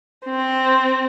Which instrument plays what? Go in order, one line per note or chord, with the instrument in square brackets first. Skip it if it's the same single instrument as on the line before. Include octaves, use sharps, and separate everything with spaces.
[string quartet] C4